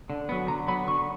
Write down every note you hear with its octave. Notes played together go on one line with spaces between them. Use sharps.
D3
F#3 B3
D3 A#5
F#3 B3 B5
D3 C#6